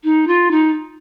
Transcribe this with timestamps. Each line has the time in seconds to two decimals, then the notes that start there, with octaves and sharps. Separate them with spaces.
0.04 D#4
0.27 F4
0.51 D#4